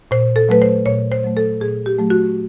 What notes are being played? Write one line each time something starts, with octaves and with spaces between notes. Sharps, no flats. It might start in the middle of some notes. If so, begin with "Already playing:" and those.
A#2 C5
A4
F#3 A3 B4
C5
A#2 C#5
C5
F#3 A3
A4
A#2 G#4
G4
F#3 A3
F#4